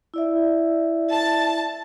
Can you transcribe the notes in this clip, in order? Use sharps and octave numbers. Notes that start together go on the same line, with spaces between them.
E4 D5 E5
A5